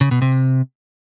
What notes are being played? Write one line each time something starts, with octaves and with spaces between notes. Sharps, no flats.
C#3
B2
C3